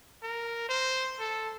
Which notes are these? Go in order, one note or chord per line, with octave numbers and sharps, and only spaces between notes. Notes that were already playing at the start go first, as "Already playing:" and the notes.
A#4
C5
A4